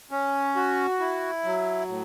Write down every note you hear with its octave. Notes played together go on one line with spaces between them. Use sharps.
C#4
F#4
E4
F#3
A2